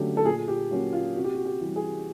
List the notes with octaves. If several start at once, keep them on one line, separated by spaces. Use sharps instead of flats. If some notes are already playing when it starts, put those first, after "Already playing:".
Already playing: D3 F#3 A3 C#4 G4
A4
A#2 G#4
G4
F#3 A#3 C#4 F#4
F4
C3 F#4
G4
F#4
G4
E3 G3
G#4